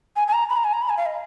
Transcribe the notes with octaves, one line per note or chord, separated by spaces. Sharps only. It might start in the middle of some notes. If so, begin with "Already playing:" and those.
G#5
G#5
A#5
B5
A#5
G#5
A#5
B5
G#5
F5
D#5